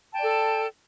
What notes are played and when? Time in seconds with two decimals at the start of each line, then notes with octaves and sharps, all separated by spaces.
0.12 A5
0.15 G5
0.18 D5
0.22 A4